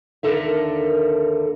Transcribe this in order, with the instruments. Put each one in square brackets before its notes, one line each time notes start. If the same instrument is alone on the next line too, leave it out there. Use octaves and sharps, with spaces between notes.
[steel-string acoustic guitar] D#2 G#2 D3 A4 A#4 E5